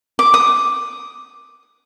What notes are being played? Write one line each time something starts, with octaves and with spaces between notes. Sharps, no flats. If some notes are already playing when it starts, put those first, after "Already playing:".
D6
D#6